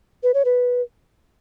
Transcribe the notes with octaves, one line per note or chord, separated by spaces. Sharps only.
B4
C#5
B4